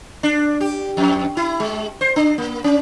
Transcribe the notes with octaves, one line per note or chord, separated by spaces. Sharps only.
D4
G4
F2
E4
G#3
C5
D4
A#3
C#4